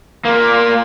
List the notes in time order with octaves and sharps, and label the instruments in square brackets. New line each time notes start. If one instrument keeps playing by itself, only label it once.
[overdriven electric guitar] A#2 A#3